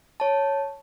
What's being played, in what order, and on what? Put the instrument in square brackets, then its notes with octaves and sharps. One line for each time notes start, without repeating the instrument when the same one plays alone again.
[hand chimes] C#5 A5